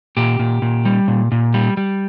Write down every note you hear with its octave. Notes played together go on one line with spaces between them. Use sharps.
A#2 G4
A#2
A#2
G3
A#2
A#2
G3
G3